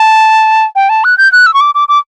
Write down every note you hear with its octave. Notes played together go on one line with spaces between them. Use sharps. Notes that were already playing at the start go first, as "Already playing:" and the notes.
Already playing: A5
G5
A5
F#6
G6
F#6
E6
C#6
D6
D6
D6